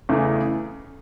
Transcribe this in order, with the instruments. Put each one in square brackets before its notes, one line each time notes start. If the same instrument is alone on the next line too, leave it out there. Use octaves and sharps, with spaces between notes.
[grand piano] E2 C#3 E3 A3 D#4